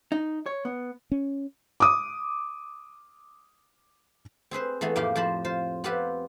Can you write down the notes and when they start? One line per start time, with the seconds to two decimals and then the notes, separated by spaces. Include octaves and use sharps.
0.12 D#4
0.46 C#5
0.65 B3
1.12 C#4
1.80 D6 D#6
4.51 C4 G#4 B4 C5
4.81 E3 A3 B3 G#4 A4
4.96 F2 A2 A#3 G4 F5
5.16 F2 F3 C5 A5 B5
5.45 F4 C5
5.84 B3 C4 F4 G4 B4